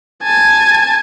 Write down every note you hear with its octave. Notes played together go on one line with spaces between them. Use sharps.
G#5 A5